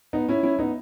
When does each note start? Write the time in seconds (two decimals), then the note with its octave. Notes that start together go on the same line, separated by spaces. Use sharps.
0.13 B3 D#4
0.28 C#4 E4
0.43 C#4 E4
0.59 B3 D#4